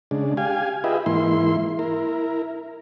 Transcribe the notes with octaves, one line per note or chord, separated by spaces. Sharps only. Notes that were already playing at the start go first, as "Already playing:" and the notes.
C#3 G#3 D4
G4 F5 G#5
F4 G4 G#4 B4 D#5 E5
G#2 E3 A#3 E4 C6
E4 A#4